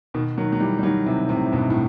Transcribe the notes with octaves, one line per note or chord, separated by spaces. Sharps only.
B2 D#3
D#3 F#3
F#3
E3 G3
G3
D#3 F#3
C3 E3
A2 C3
C3
G2 B2
A2